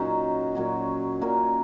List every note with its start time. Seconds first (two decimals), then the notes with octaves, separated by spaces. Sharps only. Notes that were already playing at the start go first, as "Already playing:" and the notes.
Already playing: A#2 F#3 C#4 D#4 F#4
0.55 A#2 F#3 C#4
1.21 A#2 F#3 C#4 F#4 A#4